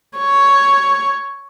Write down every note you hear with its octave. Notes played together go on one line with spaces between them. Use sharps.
C#5